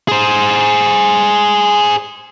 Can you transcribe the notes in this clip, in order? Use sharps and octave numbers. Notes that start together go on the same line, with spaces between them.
G#4 C5